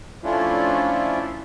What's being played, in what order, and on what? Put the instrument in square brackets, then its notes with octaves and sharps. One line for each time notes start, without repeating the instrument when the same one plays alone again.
[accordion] F3 A3 C#4 D4 E4 F4